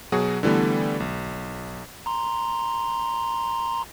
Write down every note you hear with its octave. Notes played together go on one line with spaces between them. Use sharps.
B2 F#3 F#4 G#4
D3 E3 G3 A3 B3
B1
A#5 C6